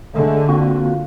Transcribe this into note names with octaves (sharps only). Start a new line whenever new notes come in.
D3 G#3 A3
A#3 C4 F4 F#4